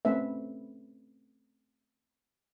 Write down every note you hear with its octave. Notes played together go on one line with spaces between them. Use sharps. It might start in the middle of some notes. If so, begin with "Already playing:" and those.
A3 C4 C#4 B4 E5